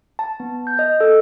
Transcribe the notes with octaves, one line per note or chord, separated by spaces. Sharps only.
A5
B3
G6
D#5
A4